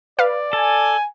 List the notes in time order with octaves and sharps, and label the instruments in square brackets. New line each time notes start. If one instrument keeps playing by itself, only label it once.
[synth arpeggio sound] B4 F5 [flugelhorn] D5
[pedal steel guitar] A4 [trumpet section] G#5